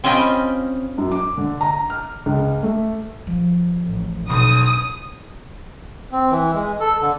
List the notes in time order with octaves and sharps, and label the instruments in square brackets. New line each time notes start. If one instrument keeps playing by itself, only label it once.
[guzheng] C4 C#4 F4 D#5 G5 B5
[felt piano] F#2
D6
D3
A#5
F6
C#2
A3
[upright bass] F3
[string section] A1
[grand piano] B1 [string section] D#6
[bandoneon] C4
E3
G#3
A4
D3